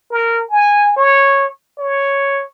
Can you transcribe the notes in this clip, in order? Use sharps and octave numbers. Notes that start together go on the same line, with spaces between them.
A#4
G#5
C#5
C#5